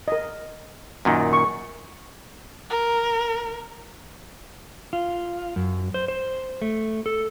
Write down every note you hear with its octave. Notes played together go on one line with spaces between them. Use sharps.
A#4 D#5
F#2 A#2 D#3
C#6
A#4
F4
F#2
C5
C5
A3
A4